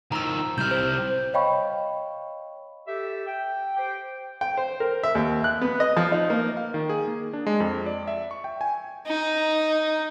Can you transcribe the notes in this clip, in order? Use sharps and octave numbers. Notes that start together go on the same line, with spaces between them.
D#3 F3 A#5 E6
C2 C3 F6 G6
C5
C#5 D#5 F5 G5 B5 C#6
G4 A4 E5
G5
G4 C5 G5
G5
C5
A#4
E5
D#2
F#6
B3
D#5
F3
D#4
A#3
F5
D#3
G#4
A#3
D4
G#3
F2
D5
E5
C#6
G5
G#5
D#4